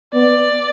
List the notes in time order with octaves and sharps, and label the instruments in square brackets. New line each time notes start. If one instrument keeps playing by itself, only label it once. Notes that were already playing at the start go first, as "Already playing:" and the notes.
[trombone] B3 [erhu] D5